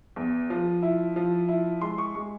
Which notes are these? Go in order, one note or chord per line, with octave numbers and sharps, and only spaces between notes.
E2
F3
E4
F3
E4
G#3 C6
C#6
G#3 C#6